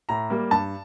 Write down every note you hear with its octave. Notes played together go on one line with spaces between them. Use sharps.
A2 A#5
G3 A#3
G2 A5